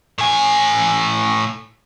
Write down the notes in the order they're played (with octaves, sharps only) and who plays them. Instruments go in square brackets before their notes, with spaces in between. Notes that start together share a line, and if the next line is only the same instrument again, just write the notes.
[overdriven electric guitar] A2 G#5